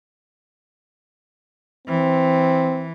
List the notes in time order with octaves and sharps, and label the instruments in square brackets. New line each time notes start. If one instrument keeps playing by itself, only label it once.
[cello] E3 [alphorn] C4